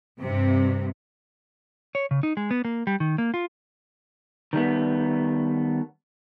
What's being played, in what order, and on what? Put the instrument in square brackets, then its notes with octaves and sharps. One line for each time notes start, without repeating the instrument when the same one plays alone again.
[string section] G2 C3
[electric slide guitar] C#5
C#3
D#4
G#3
B3
A#3
G3
D#3
A#3
F4
D#3 G3 A3 B3